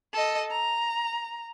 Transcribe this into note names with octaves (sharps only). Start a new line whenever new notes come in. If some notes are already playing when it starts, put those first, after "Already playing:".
A4 D#5
A#5